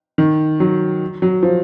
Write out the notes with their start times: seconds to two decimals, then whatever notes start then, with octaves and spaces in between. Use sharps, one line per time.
0.18 D#3
0.60 F#3
1.22 F#3
1.43 F3